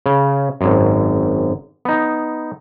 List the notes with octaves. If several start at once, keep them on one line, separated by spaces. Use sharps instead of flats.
C#3
G#1 F#2
B3 D#4